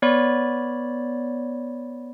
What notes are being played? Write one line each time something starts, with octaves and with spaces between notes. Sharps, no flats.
B3 C#5 D5 B5